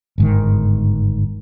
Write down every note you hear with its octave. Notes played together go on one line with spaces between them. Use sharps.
G1 G#2 D#3